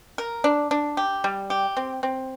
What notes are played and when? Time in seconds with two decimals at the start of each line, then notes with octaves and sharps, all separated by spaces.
0.18 A#4
0.44 D4
0.71 D4
0.97 G4
1.24 G3
1.50 G4
1.77 C4
2.03 C4